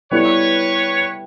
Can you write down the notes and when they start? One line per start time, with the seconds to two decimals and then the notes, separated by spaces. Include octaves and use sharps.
0.11 G3 B3 E4 A4 B4 C#5